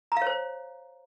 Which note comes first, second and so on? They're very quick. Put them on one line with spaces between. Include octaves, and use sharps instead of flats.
A#5 F5 C#5 C5